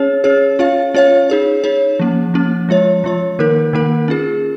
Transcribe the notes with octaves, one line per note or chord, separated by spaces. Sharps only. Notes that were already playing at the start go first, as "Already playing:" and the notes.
Already playing: C#4 G#4 C#5
C#4 G#4 C#5
C#4 F4 C#5 F5
C#4 F4 C#5 F5
D#4 G#4 C#5
D#4 G#4 C#5
F3 A#3 C#4
F3 A#3 C#4
F3 G#3 F4 C#5
F3 G#3 F4 C#5
D#3 A#3 D#4 A#4
D#3 A#3 D#4 A#4
C#4 F4 G#4